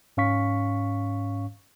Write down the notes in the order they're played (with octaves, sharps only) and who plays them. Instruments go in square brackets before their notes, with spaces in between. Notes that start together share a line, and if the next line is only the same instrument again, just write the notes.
[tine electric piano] G#2 C#4 F5 C#6 B6